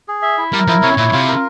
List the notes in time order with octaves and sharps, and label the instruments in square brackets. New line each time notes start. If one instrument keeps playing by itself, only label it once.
[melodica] G#4
E5
E4
[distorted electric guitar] G3 [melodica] A#4
[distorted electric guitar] F3 [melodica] E4
[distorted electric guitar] C3 [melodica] C#5
[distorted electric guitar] A#2 [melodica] E4
[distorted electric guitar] C3 [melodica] F4
[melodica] A#4